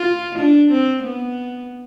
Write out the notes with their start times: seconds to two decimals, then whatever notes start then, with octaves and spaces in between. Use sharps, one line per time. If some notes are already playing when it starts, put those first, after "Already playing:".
Already playing: F4
0.39 D4
0.72 C4
1.03 B3